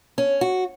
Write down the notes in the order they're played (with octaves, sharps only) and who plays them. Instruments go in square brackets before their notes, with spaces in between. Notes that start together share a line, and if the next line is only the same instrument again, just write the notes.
[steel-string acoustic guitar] C#4
F#4